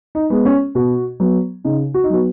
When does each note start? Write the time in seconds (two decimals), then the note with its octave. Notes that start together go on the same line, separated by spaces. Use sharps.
0.15 D#4
0.30 G#3 B3
0.45 C#4
0.75 B2 F#4
1.20 F#3 B3
1.64 C#3 D#4
1.94 F#4
2.04 D#4
2.10 F#3 B3 F#4